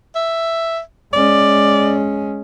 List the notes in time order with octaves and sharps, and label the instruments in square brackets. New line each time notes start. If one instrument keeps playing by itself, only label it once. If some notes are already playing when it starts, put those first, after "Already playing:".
[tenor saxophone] E5
[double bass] G#3 C#4 [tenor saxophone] D5